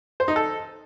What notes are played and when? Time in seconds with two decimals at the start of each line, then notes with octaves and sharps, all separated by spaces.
0.20 C5
0.28 D#4
0.36 A4